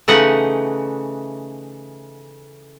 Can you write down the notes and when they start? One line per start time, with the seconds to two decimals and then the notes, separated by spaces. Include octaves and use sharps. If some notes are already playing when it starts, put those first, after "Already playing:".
0.08 C#3 E3 A3 D#4 F#5